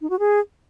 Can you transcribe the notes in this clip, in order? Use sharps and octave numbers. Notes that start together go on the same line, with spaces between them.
D#4
F#4
G#4